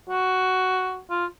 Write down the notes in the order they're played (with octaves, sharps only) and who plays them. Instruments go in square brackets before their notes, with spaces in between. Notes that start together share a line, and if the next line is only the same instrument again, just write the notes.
[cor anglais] F#4
F4